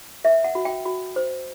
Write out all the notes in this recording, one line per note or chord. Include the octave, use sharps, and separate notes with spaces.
B4 E5
F#5
F#4
G5
F#4
C5